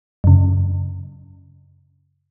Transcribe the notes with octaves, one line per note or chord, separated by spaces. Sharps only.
F#2 C#3